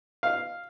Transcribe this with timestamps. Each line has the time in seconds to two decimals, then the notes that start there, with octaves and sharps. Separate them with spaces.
0.23 F5